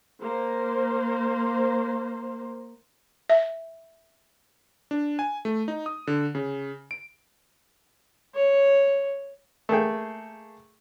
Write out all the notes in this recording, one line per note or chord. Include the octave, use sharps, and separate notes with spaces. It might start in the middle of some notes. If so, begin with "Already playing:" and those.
A#3 C5
E5
D4
G#5
A3
D#4
D#6
D3
C#3
D7
C#5
A3 A#3 G#4 G5